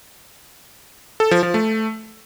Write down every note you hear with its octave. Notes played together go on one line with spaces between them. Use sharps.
A4
F3
F3
A3